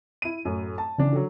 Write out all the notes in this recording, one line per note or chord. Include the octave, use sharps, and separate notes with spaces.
E4 D#7
F#2 A2
A5
C#3 E3 D4
D3 F#3